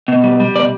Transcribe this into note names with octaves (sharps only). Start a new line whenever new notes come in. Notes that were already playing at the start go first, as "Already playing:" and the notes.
B2
G3
G3
B2 D5